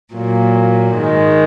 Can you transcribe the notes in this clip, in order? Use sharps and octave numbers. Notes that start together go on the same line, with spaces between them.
A#2 F#3 A#3
G#2 D#3 G#3